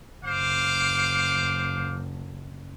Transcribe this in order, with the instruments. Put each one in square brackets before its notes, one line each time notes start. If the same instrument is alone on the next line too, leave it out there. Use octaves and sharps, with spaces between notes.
[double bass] F#1 [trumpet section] C5 F5 D6